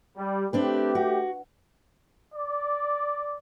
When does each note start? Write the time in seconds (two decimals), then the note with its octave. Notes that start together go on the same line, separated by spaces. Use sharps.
0.17 G3
0.53 A3 C4 D4 G4 B4
0.95 F#4
2.34 D5